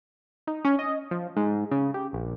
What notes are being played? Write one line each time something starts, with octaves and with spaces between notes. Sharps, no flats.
D#4
C#4
D#5
F3
G#2
C#3
G4
A#1